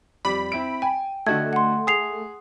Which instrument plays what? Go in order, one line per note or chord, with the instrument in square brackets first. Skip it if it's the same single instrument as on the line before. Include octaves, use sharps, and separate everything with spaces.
[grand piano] F2 G3 D6 [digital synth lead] B5
[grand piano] C4 E4 D7
[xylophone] G5 [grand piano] G#5
[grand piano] D3 F#4 D#5 [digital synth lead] A3 [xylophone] G#6
[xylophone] F#5 C6
[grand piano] G#4 [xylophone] D#6 C7 F7